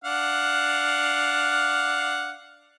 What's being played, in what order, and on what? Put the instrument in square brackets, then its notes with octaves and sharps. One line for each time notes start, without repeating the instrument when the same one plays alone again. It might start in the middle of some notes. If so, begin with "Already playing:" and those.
[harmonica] D4 F5 F#5